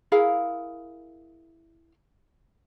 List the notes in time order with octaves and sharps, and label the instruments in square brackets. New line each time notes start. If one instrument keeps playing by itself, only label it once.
[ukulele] E4 G#4 A#4 F5